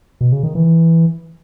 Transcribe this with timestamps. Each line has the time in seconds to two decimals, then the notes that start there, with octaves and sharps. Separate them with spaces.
0.21 B2
0.32 C#3
0.43 D#3
0.55 E3